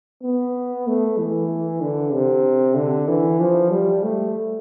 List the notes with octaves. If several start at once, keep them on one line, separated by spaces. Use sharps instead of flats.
B3
A3
E3
D3
C3
D3
E3
F3
G3
A3